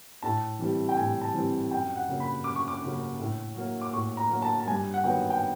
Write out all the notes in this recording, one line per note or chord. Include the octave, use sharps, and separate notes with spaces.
A2 A5
E3 G3 C4
G5
A2 G#5
A5
E3 G3 C4
F#2 G5
F#5
C#3 F#3 A#3
B5
F#2 D6
C#6
D6
C#3 F#3 A#3
A2
F#3 A#3
D6
A2 C#6
A#5
F#3 A#3
A5
A5
G2 G#5
F#5
D#3 F#3 B3 G5
G5